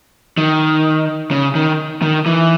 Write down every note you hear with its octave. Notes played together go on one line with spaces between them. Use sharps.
D#3
C#3
D#3
D#3
E3